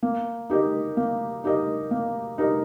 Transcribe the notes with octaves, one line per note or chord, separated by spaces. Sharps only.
A#3
D#4 G4 A#4 D#5
A#3
D#4 G4 A#4 D#5
A#3
D#4 G4 A#4 D#5